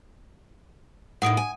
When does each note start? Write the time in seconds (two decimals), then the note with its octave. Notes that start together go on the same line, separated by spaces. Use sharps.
1.22 A2 D#3 F#5 D#6 D7
1.37 G#5